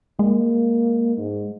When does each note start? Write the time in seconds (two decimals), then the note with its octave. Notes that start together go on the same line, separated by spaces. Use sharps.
0.19 G#3 A#3
1.17 G#2